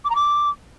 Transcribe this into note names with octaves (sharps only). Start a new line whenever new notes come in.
D6
A#5
D6